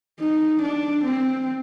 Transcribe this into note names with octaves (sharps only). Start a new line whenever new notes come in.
D#4
D4
C4